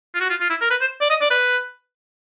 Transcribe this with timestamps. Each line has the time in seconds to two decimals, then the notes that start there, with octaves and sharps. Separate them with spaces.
0.14 F4
0.20 F#4
0.30 F4
0.41 F4
0.50 E4
0.61 A#4
0.71 B4
0.81 C5
1.01 D5
1.10 D#5
1.21 D5
1.30 B4